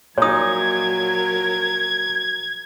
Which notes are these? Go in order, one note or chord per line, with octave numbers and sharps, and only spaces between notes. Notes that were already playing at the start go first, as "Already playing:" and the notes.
A#2 F3 F#3 D#4 A#4 C#5 D#6 G#6